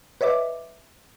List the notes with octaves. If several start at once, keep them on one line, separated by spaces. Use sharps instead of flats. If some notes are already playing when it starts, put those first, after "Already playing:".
B4 C#5 D#5 E5 D6